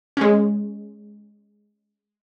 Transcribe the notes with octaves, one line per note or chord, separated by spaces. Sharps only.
G#3 C#4